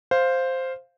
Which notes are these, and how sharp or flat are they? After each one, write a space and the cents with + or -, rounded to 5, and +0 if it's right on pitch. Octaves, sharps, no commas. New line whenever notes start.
C5 +0 F5 +0